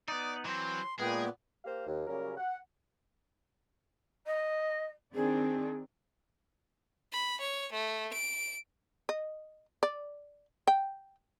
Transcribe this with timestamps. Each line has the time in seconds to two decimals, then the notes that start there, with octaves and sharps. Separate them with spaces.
0.08 B3 D#4 D5
0.45 E3 F#3 C4 C6
1.00 A#2 G#3 B3 G#4 G5
1.65 A#3 G4 C5 F5
1.87 D#2
2.07 C#3 F#3 G3 A#3 C#4 A#4
2.37 F#5
4.26 D#5
5.14 D#3 C4 D4 G#4
7.12 B5
7.40 C#5
7.72 A3
8.13 D7
9.09 D#5
9.83 D5
10.67 G5